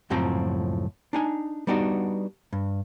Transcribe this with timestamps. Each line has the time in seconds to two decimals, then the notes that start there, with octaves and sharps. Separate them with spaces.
0.10 C#2 F#2 A2 F3 C4 A#5
1.13 D4 D#4 G#5
1.67 G3 B3 D4 D#4 F#4
2.53 G2